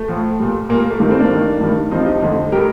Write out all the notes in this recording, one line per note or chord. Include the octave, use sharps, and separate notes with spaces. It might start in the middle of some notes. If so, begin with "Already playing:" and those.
Already playing: A3
A2 F3
A#2 G3
A#2 G3 A#3
A#3
A3
G2 D#3 G3 A#3
A3 C4
A#3 D4
G2 D#3 G3
G2 D#3 G3
G2 F3 C4 D#4
D#4 G4
F2 D3 G3
A2 G3 G4 A#4